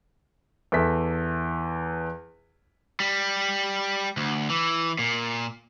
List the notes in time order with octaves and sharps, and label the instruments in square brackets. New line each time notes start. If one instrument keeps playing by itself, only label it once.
[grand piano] E2 A4 E5 B6
[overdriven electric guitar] G3
D2
E3
A#2